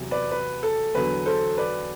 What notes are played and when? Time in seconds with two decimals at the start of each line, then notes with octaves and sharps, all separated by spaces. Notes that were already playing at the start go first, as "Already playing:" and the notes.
Already playing: E2 C3 F#3
0.11 B4 D5
0.31 B4
0.63 A4
0.95 E2 D3 F#3 B4
1.26 A4 C5
1.57 B4 D5